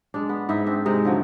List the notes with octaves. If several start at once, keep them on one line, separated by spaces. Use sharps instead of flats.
G#3 D4
B3
G#2 D#4 E4 E5
C4 D4 E5
C3 G#3 D#4 A#4
D3 F3 F#3